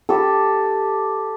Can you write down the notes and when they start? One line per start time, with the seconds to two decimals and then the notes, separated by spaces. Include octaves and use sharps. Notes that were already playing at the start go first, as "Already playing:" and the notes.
0.09 G4 A4